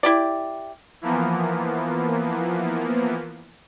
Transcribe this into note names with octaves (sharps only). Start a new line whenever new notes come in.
E4 G4 D5
E3 F3 A#3 B3